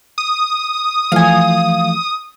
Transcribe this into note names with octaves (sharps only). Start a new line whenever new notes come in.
D#6
E3 F3 A3 F5 G#5